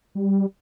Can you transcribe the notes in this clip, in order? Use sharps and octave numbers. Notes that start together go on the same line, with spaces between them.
G3